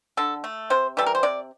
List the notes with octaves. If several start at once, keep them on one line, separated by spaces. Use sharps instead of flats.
D3 A4
A3
C3 C5
E3 G3 A4
A#4
C5
C3 D5